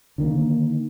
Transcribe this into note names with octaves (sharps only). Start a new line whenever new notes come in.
D3 D#3 A3 A#3